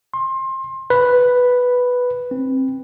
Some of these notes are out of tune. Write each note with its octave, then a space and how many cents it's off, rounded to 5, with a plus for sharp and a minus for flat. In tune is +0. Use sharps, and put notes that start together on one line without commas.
C6 +25
B4 +0
C4 +15